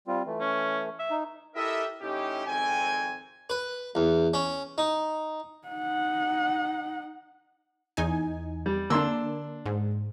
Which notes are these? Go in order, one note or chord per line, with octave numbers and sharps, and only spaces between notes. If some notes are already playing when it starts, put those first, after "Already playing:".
G3 C4 F4
E3 A3
C#4
E5
D#4
E4 G4 A4 A#4 D#5 E5
A2 C#4 D#4 E4 G4
G#1 F2 C4 G5 G#5
B4
E2
C#4
D#4
D#4 F#5
E2 D#4 G#5
G3
D3 A#3 D4 C6 E6
G#2